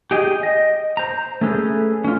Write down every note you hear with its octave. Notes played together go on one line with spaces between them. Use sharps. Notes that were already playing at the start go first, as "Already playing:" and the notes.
G4 G#4 D#5 G5
D#5
C5 A#5
A3 C#4 G#4 A4 B4
C#4 F4